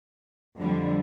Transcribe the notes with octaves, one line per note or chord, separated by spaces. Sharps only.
F2 D3 G3